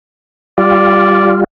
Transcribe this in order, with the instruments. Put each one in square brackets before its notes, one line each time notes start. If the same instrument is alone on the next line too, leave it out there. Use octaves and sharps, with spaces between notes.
[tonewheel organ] G3 F4 [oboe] D5